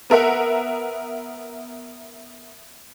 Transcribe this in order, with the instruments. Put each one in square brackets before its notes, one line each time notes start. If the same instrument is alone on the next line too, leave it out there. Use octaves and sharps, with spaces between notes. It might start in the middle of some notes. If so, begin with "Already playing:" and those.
[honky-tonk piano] B3 A#4 E5 F#5